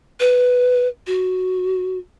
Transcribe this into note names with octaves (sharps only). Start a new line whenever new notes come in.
B4
F#4